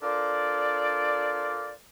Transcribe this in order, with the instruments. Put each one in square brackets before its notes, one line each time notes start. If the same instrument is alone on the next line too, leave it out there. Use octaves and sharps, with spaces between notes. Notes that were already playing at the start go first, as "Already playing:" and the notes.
[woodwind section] D4 F4 A4 A#4 C5 D5